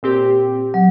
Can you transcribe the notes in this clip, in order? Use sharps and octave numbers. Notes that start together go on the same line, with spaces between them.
A#2 C4 G4
F#3